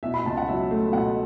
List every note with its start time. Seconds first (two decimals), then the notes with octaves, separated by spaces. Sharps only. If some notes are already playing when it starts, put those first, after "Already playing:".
0.03 B2 E5
0.14 B5
0.25 C#2 A5
0.37 F#5
0.48 F#3 E5
0.71 A3
0.93 B2 F#5